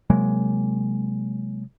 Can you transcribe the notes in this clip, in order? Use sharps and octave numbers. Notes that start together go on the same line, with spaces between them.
C3 F#3 G#3 A#3